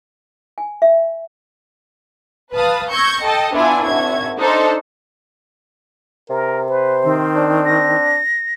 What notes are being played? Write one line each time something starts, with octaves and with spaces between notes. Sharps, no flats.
G#5
E5
B4 F5 A5 D#6
C#6 E6 G6 G#6 A#6 C#7
A4 D#5 G5 A5
B3 D4 E4 F4 E5 G#5
G#1 F#4 E5 G#6
D4 D#4 A4 C5
C3 A#4
B4 C5
D#3 C4
D4
A#6